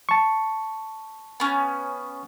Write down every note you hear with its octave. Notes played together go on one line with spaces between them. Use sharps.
A5 C#6
B3 C#4